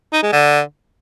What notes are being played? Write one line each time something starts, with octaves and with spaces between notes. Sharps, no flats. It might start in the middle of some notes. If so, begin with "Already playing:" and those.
D#4
G#3
D3